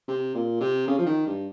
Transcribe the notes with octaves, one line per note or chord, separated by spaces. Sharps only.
C3
A#2
C3
C#3
F3
D#3
G2